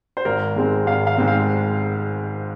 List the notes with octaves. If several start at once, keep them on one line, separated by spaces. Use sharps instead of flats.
C5
G#1 A#4
G#2 G#3 C4
G#1 F5
F5
G#2 G#3 C4
F5